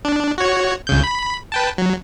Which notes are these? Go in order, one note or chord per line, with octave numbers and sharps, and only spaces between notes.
D4
F#4 C#5
C#2 C#3 G6
B5
B4 G5 A5
F#3